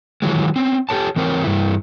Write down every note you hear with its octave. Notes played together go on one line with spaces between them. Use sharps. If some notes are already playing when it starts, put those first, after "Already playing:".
D#3 E3 F#3 G#3
C4 C#4
G4 A4 C#5 A5
E3 C4 A#4 C5 C#5
G2 E3 E4